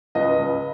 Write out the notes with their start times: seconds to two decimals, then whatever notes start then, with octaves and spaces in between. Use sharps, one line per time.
0.15 C#2 B4 D#5
0.39 C#2